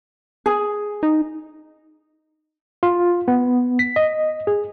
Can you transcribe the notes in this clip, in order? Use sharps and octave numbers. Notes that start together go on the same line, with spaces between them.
G#4
D#4
F4
B3
B6
D#5
G#4